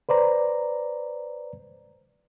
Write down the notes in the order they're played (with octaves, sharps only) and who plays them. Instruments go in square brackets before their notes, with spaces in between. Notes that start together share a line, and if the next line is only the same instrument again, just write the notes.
[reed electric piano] B4 C5 D5 A#5